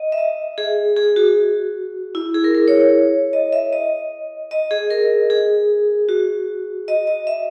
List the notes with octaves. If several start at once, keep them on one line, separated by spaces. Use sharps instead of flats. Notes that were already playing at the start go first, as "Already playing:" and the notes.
Already playing: D#5
E5
D#5
G#4
G#4
F#4
E4
G#4
A#4
A#4
C#5
C#5
D#5
E5
D#5
D#5
G#4
A#4
G#4
F#4
D#5
D#5
E5